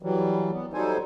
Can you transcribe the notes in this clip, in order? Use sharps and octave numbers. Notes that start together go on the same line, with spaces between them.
E3 F#3 G3
B3
F#3 G3 D#4 A4 C5 G#5